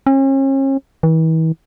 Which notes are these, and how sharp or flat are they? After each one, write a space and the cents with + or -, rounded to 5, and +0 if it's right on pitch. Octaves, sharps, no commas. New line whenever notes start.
C#4 -40
E3 -40